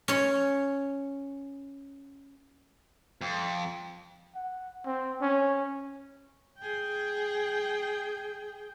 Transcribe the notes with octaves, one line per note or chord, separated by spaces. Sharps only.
C#4 C#5
F2
F#5
C4
C#4
G#4 G5